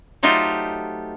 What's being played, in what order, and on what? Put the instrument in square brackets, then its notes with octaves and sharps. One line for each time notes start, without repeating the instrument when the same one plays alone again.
[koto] F#3 A3 D#4 F4 G4 C5